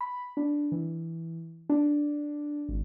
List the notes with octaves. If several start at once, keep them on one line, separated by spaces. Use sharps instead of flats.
B5
D4
E3
D4
G#1